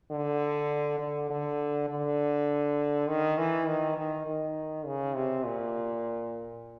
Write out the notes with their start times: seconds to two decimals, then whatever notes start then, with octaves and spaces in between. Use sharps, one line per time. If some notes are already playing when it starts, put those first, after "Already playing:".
0.11 D3
0.99 D3
1.30 D3
1.89 D3
3.08 D#3
3.38 E3
3.67 D#3
3.97 D#3
4.27 D#3
4.86 C#3
5.15 C3
5.46 A#2